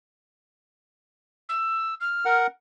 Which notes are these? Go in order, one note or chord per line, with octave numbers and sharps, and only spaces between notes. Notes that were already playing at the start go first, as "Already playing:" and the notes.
E6
F6
A#4 F#5